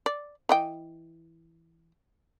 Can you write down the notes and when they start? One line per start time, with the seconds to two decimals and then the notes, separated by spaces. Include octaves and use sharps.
0.06 D5
0.49 E3 D#5 G5